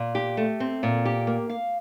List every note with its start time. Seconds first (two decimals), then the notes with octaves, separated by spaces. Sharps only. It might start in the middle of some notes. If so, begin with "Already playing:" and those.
Already playing: A#2
0.15 G4
0.37 A3
0.60 C4
0.83 A#2
1.05 G4
1.27 A#3
1.49 F5